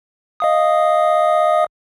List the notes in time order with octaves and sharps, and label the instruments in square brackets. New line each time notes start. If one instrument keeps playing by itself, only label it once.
[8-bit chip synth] D#5 F5 D#6